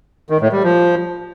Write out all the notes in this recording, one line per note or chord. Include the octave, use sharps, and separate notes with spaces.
D#3
A2
G3
F3